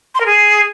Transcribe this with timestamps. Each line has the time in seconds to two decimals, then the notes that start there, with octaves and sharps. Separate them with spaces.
0.15 C6
0.20 A#4
0.26 G#4